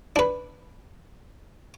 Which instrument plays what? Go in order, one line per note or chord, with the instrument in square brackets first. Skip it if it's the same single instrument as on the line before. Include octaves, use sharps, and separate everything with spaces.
[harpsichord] D4 B4